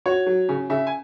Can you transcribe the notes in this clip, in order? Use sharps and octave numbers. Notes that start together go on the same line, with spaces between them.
F#4 C#5
F#3
C#3
C#3 E5
G#5